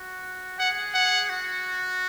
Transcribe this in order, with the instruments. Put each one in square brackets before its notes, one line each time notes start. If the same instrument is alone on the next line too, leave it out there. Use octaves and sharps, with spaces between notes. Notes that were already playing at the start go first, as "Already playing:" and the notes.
Already playing: [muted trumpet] F#4
[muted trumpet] G#4 [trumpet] F#5
[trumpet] F#5
[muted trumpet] F#4